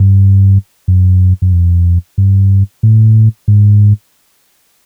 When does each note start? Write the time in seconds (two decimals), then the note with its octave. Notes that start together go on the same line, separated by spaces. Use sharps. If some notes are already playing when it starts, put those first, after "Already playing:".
Already playing: G2
0.88 F#2
1.42 F#2
1.53 F2
2.18 G2
2.83 A2
3.48 G#2